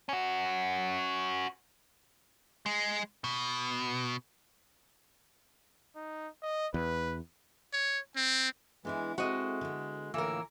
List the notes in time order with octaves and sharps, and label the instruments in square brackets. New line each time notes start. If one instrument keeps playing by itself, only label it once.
[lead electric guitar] C#4 F#4
G#3
B2
[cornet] D#4
D#5
[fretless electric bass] E2 [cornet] B4
[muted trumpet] C#5
C4
[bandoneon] E3 G#3 [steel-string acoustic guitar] B3 D4 E4
[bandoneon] G#3 [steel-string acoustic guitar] C4 E4 A4 [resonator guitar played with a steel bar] F#4 D#5
[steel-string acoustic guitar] D3 B3
[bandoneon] A2 A#3 E6 [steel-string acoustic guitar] D3 F4 B4 [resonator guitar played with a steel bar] E3 A#4